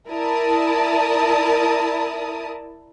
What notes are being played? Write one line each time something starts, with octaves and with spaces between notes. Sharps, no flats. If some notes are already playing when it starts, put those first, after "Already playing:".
E4 A#4 D5 A5 D#6